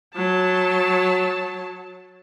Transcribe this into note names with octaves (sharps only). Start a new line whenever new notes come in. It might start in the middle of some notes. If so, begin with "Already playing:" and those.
F#3 A5